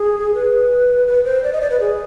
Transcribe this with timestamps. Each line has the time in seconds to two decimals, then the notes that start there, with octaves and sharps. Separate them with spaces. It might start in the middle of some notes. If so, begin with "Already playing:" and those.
Already playing: G#4
0.35 B4
1.07 B4
1.24 C5
1.44 D5
1.53 D#5
1.61 D5
1.70 B4
1.80 G#4